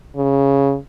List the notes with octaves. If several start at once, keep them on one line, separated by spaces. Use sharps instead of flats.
C#3